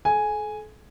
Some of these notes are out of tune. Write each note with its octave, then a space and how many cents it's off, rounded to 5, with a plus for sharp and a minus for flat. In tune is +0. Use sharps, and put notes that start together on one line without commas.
A4 -40 G#5 +0